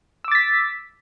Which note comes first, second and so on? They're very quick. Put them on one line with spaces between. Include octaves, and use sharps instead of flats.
E6 D6 A6 B6